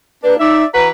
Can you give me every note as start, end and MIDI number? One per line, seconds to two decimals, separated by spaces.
0.24 0.35 58
0.24 0.35 62
0.24 0.38 71
0.39 0.64 63
0.39 0.64 74
0.39 0.64 76
0.74 0.89 52
0.74 0.89 66
0.74 0.89 71
0.74 0.89 82